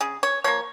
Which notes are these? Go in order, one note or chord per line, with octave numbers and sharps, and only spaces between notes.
C#3 G#4
C#5
F3 A#3 C#5